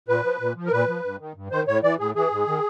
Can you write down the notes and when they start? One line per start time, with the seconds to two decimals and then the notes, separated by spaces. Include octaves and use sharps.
0.08 A#2 B4
0.24 F3
0.40 A#2
0.56 F3
0.66 A#4
0.72 A#2 B4
0.88 F3
1.04 G2
1.20 D#3
1.36 G2
1.51 D#3 C5
1.68 A2 C#5
1.83 E3 D5
1.99 A2 G#4
2.15 E3 G#4
2.31 G#2
2.47 D#3